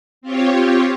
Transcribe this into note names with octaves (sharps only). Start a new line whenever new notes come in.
C4 F4 G4 C#5